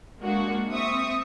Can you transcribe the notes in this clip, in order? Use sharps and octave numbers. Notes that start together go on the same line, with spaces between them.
G#3 A#3 D4 F#4
C4 E5 C#6 D#6